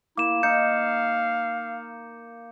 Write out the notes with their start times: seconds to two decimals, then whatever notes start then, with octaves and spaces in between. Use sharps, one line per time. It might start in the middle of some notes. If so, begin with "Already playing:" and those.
0.17 A#3 E4 D6 E7
0.43 D#4 F5 G6 C#7